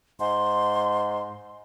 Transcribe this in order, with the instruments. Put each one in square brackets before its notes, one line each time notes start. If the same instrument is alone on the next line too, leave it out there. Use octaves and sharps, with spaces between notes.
[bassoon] G#2 [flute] C6